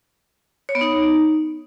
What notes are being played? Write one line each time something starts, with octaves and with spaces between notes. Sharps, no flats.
C#5
B3
D#4